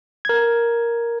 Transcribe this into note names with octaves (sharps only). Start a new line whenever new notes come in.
A#4 G#6